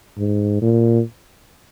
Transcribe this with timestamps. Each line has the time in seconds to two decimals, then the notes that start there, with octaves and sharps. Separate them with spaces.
0.18 G#2
0.62 A#2